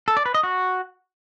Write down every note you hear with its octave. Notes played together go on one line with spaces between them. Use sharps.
A4
D5
B4
D#5
F#4